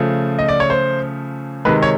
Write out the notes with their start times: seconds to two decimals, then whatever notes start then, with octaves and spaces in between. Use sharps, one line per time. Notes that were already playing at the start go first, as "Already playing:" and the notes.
Already playing: C#3 F3 A3
0.39 D#5
0.49 D5
0.60 C#5
0.70 C5
1.65 C3 D#3 G#3 B4
1.83 C#5